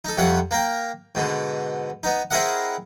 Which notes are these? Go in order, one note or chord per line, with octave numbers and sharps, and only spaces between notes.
D#4 A4
F2 C3 G3 C#5 F#5
A#3 A#4 G5
G#2 B2 D3
B3 D#4
C4 E4 G#4 A#4 D#5 F#5